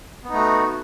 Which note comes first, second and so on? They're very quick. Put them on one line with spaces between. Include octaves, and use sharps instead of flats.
B3 D#4 A3 F#4